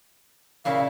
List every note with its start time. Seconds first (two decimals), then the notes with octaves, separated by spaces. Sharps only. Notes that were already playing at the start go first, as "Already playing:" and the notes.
0.65 A#2 C#3 E4 F5